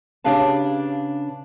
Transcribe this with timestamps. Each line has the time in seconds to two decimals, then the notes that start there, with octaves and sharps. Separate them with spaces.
0.24 C#3 D4 G4 B4 F5 A5